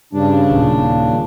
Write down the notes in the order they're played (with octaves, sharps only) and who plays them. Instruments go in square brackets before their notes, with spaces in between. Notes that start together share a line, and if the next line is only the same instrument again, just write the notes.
[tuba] G2 [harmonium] C#3 D4
[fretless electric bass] D#1 [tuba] A#2